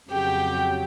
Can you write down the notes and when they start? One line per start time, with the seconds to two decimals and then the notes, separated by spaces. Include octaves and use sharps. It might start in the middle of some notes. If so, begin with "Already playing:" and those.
0.11 F2 C#3 F#3 G4 G5